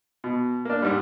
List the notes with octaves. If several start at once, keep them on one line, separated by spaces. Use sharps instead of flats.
B2
A#3 D4
G#2 G3